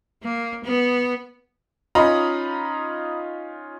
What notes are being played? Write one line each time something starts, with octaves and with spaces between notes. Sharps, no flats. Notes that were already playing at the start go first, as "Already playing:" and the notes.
A#3
B3
C#4 D#4 F4 D#5 A#5 B5